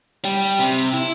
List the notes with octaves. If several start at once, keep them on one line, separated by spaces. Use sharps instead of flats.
G3
C3
E4